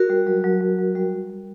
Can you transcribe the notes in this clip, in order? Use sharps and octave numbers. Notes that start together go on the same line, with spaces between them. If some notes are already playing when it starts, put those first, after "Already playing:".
Already playing: F#4 A#4
G3
F#3
F#3
F#3
F#3
G3
G3
G3